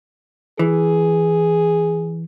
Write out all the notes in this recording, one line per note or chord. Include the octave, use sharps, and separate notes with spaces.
E3 G#4